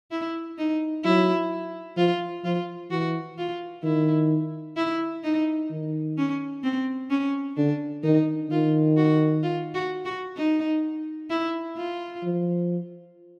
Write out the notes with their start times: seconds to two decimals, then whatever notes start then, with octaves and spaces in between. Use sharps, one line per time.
0.11 E4
0.58 D#4
1.04 F#3 E4
1.97 F3 F4
2.44 F3 F4
2.90 E3 F#4
3.38 F4
3.83 D#3 E4
4.77 E4
5.23 D#4
5.71 D#3
6.17 C#4
6.63 C4
7.10 C#4
7.57 D3 D4
8.03 D#3 D#4
8.50 D#3 F4
8.96 F#4
9.43 F4
9.74 F#4
10.05 F#4
10.36 D#4
11.30 E4
11.76 F4
12.23 F3